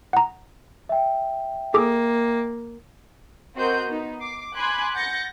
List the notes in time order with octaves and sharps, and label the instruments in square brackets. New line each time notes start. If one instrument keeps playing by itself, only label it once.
[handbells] F#5 A#5
[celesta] E5 G5
[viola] A#3 [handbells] G#4 A4 D6
[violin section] C4 F#4 A#4 D#5 C6 G6
B3 D#4
D6 C7
G#5 B5 C6 D6 F#6 G#6
F#5 G6 A6 A#6 C#7